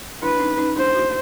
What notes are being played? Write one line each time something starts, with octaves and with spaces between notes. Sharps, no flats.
D4 E4 B4
D4
C#4 D#4
C#4 D#4
D4 E4 C5
E4 F#4